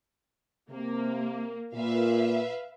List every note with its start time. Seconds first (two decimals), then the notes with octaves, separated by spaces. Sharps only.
0.70 C3 A#3
1.74 A#2 B4 E5 F5